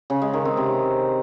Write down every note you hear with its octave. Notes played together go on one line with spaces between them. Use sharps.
C#3
G#3
D#3
C4
C3